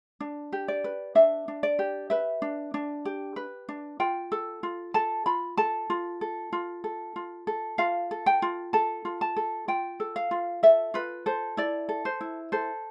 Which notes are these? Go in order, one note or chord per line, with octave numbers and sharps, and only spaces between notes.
D4
G4
D5
B4
D4 E5
D4
D5
G4
B4 E5
D4
D4
G4
B4
D4
F4 G5
A4
F4
A4 A5
F4 B5
A4 A5
F4
A4
F4
A4
F4
A4
F4 F5
A4
G5
F4
A4 A5
F4
A5
A4
F4 G5
A4
F5
F4
A4 E5
F4 B4
A4 C5
E4 D5
A4
C5
E4
A4 C5